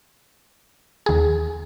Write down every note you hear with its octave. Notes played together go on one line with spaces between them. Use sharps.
D#2 G#4